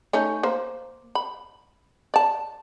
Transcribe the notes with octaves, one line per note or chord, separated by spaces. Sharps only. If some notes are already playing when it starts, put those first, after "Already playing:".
A3 C#4 D#4
A#3 C5
B5
D5 A5